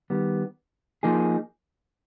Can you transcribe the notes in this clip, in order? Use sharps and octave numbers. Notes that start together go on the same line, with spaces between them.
D#3 G3 B3
F3 A#3 D#4 G#4